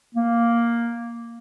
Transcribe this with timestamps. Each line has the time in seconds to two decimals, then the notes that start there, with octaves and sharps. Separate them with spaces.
0.15 A#3